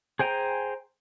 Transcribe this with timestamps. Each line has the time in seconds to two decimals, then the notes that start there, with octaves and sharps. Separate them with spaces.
0.19 G#4 C5 G5 G#5 A#5